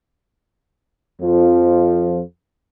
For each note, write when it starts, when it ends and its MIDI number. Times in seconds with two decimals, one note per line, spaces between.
1.21 2.21 41
1.21 2.21 53